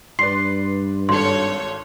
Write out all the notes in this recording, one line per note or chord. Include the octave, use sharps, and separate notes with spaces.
G2 B4 D5 C6 C7
G#1 A4 C#5 C6